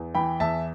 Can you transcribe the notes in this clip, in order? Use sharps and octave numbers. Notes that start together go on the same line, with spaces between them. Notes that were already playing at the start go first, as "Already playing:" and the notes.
Already playing: E2
E3 G5 B5
E2 E5 A5